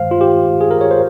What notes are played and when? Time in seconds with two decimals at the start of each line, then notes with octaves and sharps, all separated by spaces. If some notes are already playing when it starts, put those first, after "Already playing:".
Already playing: G2 D#3 G#3 C5 F5
0.11 F4
0.21 G4
0.61 G#4
0.71 A#4
0.81 C#5
0.91 C5